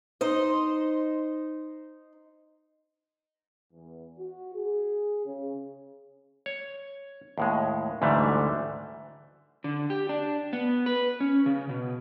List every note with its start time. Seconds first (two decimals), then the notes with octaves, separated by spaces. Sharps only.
0.21 D#4 C5 D#5
3.72 E2
4.19 F#4
4.55 G#4
5.25 C#3
6.46 C#5
7.38 D#2 A2 G#3
8.02 D2 G#2 D3 E3 G3 A3
9.64 D3
9.90 G4
10.09 D4
10.53 B3
10.86 B4
11.20 C#4
11.46 C#3
11.69 B2